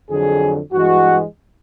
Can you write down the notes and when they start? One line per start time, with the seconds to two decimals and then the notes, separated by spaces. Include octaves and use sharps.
0.10 F2 D3 F#3 G#4
0.73 G2 E3 G#3 F#4